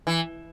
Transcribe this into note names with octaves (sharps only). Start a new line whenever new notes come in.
E3